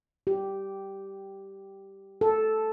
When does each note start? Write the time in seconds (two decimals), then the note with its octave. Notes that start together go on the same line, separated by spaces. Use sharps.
0.27 G4
2.21 A4